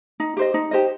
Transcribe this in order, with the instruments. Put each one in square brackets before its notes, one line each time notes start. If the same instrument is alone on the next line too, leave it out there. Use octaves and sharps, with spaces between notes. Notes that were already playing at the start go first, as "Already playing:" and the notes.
[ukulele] D#4
G4 C5 D#5
D#4
G4 C5 D#5